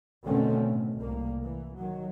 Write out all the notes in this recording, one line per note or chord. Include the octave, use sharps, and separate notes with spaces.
B2 D3 D#3 A3 C4 C#4
A2
C2 A2 A#3
E3
D#3 F#3